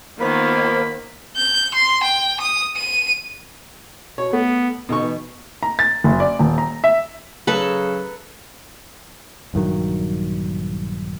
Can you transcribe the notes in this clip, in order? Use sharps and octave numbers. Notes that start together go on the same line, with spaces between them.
D#3 A#3 B3 F4 C5 B5
G6
C6
G5
D#6
D#7
B2 C#5
A3 B3
B2 D3 D#4 C#6
E3
A#5
A6
F#1
D5
D#1
A#5
E5
C#3 F#3 A4 B4
A#1 G2 D#3 F#3